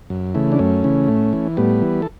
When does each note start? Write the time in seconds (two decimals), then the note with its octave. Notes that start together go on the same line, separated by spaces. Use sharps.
0.10 F#2
0.35 C#3 E3 A3
0.52 D4
0.59 F#2 A3 C#4
0.84 C#3 E3
1.08 A2
1.33 E3
1.57 A2 G3 B3
1.82 E3
2.02 A4